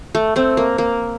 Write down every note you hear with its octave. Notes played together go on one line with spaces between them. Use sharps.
A3
A3 C4
A#3
A#3